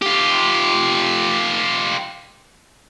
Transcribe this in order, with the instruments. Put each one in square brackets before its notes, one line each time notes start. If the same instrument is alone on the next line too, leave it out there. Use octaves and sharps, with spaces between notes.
[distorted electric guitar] F4 G4